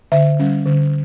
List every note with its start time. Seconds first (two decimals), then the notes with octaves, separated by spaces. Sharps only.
0.12 D3 E5
0.39 G3 C#4
0.66 D3